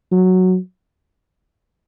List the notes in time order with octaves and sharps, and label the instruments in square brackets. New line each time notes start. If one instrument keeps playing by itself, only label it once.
[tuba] F#3